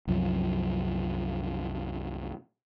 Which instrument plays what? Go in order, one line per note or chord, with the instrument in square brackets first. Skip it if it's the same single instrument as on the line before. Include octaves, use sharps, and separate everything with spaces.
[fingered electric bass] C2 F#2 F3 F#3